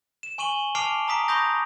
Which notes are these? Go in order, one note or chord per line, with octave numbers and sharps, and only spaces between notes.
E7
G#5 C#6 D#7 F#7 G7
A5 D6 F6 C7 D7 F7
A#5 D#6 B6 D7
B5 C#6 D#6 G6 A#6